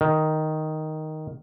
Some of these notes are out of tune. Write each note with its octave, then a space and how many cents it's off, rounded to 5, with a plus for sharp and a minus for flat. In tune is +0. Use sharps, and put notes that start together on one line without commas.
D#3 +0